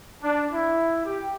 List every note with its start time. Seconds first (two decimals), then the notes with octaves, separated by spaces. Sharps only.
0.23 D4
0.53 E4
1.06 G4